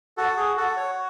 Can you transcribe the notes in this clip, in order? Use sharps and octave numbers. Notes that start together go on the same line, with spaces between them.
F#4 A4
G#4
F#4 A4
C#5